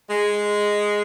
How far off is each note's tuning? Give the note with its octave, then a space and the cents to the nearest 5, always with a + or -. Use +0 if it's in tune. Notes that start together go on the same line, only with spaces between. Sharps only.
G#3 -5